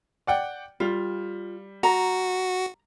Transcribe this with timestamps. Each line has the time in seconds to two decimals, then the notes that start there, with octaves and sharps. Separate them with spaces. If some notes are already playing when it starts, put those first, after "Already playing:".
0.27 D5 F#5 G5
0.80 G3 F4
1.83 F#4 A#5